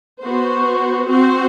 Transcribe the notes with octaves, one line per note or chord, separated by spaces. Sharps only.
B3 F#4 C5
C4 F#4 C5